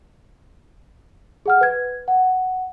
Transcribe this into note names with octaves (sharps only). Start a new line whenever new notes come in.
G#4 F#5 F6
B4 G#6
F#5